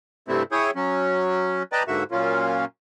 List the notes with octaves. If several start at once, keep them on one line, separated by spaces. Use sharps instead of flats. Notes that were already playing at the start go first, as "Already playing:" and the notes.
G2 C3 G3 A3 C4 E4
E4 G#4 C#5 G5 D#6
F#3 C#4
B4 D5 D#5 G5 A5 A#5
G#2 D3 A#3 F#4 E5
F#2 A#2 A#3 C#4 F4